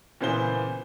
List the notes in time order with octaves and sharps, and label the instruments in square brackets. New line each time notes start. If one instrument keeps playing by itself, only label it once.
[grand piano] A#2 C#3 E3 B3 C5 G7